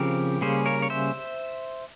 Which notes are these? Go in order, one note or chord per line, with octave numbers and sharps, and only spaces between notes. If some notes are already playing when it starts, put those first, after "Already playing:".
Already playing: C#3 F3 C4 G4 A#4
C#3 G3 A#3 C#4 G#4 C5
A#4 C#5
C#5
C5 E5